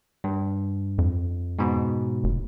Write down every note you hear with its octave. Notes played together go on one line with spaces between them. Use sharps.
G2
F2
G#2 B2
F1